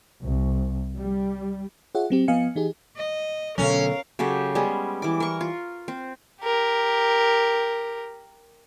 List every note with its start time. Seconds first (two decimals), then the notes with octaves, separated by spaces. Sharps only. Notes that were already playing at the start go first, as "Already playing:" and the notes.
0.23 C2
0.98 G3
1.95 F4 G#4 C#5 E5 F#5
2.10 F#3 C4 G4
2.28 F3 B3 D#5 F5 G#5 C#7
2.55 E3 D#4 G4 G#4
2.96 D#5
3.58 B2 D3 F#3 C#4 A4 A#4 F5
4.19 C#3 F#3 G4 A4
4.55 G3 G#3 B3 C#4
5.02 E3 D6
5.20 A#4 C#6
5.41 F4
5.88 C4
6.42 G4 A#4